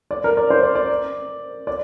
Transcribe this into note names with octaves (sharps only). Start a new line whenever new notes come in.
D5
A#4
D5
C5
D5
D5
D5